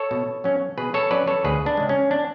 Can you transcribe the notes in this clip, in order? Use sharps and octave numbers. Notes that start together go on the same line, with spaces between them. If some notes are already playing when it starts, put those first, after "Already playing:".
Already playing: A4 C#5
B2
F#3 C#4
B2 G#4 B4
A4 C#5
F#3 C#4 B4 D5
A4 C#5
D2 G#4 B4
D4
C#3 G#3
C#4
D4